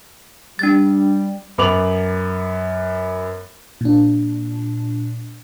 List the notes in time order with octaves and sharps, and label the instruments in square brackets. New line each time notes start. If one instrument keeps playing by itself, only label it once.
[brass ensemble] G3 [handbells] D4 A6
[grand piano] F#2 B3 D6 F7 F#7
[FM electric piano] A#2 D4